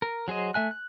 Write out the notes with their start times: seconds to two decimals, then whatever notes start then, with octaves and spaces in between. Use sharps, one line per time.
0.02 A#4
0.28 F#3 G#4 C5 D#5
0.54 A3 E5 G#5 F#6
0.71 F#6